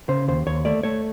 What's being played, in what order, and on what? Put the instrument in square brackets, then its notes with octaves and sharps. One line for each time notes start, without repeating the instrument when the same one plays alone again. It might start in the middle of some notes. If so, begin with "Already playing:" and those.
[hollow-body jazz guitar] C#3 C5
D#2 C5
D#2 C#5
A3 D5
A3 C#5